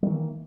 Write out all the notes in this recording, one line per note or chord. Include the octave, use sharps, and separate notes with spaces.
D#3 E3 G3 A#3